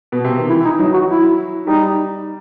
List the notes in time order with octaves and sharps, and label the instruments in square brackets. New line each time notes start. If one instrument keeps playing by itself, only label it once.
[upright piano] B2
C3
D#3
[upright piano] E3 [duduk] E4
[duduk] E4
D#4
[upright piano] F#3 [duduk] D#4
[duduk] F#4
E4
[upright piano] G3 [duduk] D#4